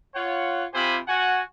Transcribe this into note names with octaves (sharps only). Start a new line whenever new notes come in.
F4 C#5 F#5
C3 F4 G4 C5 G#5 B5
F#4 F#5 G#5